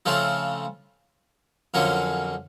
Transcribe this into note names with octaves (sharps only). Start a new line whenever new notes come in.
C#3 F3 A3 C4 F4
F2 D3 F#3 A#3 C#4